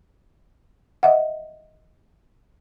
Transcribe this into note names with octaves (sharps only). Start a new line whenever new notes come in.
D#5 E5 F#5